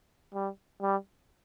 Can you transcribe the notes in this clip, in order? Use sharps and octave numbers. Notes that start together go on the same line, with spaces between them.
G3
G3